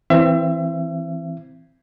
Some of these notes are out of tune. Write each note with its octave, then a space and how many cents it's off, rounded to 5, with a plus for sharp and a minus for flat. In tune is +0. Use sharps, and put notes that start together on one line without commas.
E3 +0 C4 +0 E5 +35